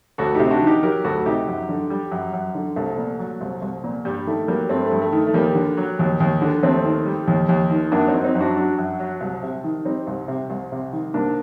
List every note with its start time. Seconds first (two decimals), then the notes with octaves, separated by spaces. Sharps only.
0.18 D2 F#4 A4
0.35 C3 D#4 G4
0.51 D4 F#4
0.61 D#3
0.67 D#4 G4
0.83 F#3 G4 A#4
1.04 D2 F#4 A4
1.26 C3 D#4 G4
1.47 F#2
1.69 D3
1.90 G3
2.12 F#2
2.34 F#2
2.55 D3
2.76 C2 A3
2.98 A#2
3.19 F#3
3.41 C2
3.62 C2
3.84 A#2
4.05 G2 G3
4.26 D#3 A3
4.48 F#3 G3 A#3
4.69 G2 A3 C4
4.86 A3
4.91 G2
5.02 A3
5.13 D#3
5.27 A3
5.34 D#2 G3 A#3
5.55 D3
5.77 F#3
5.99 D#2
6.20 D#2
6.42 D3
6.62 D#2 A3 C4
6.85 D#3
7.06 G3
7.27 D#2
7.49 D#2
7.71 D#3
7.92 F#2 A#3 D4
8.08 C4 D#4
8.14 F#3
8.24 C4 D#4
8.35 F#2
8.40 D4 F#4
8.56 F#3 D4 F#4
8.78 F#2
8.99 F#3
9.21 C2
9.43 C3
9.64 D#3
9.85 G3 C4 D#4
10.07 C2
10.28 C3
10.50 C2
10.72 C3
10.93 D#3
11.14 C2 A#3 D4